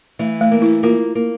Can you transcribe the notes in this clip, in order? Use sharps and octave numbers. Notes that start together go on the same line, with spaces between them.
E3 A3
A3
A#3
E4
A#3 F4
A#3